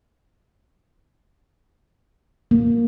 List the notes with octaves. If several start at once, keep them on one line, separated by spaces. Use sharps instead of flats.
A#3